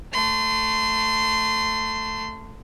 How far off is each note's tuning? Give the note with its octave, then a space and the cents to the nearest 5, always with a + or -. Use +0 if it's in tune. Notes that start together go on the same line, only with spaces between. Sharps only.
A3 +10 C6 -25